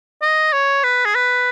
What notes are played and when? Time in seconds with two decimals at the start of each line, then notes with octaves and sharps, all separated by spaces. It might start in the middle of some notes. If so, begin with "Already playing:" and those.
0.22 D#5
0.53 C#5
0.84 B4
1.05 G#4
1.15 B4